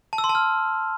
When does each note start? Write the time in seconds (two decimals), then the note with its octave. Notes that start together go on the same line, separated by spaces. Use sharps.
0.13 A5
0.18 E6
0.24 C6
0.29 A5
0.35 F6